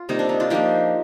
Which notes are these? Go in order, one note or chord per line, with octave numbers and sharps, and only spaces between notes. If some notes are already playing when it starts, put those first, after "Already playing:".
Already playing: F4
C3 G3 A#3 D#4
D4
D#4
D4 F4
F3 A#3 D4 D#4 G4